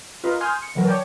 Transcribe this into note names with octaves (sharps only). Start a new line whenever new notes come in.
F4 A#4 B4 D#5
G#5 C6 D#6 F6 G6
C#7
D3 E3 F#3 A#4 B4
C#5 D5 G5 A5